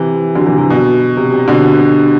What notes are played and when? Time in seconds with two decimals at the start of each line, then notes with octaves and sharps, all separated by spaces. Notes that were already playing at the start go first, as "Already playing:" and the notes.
Already playing: C3 E3
0.35 D3 F#3
0.46 C3 E3
0.58 C3
0.70 B2
1.17 C3
1.32 C3
1.48 B2 D3